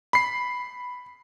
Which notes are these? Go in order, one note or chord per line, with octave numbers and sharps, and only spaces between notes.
B5 C7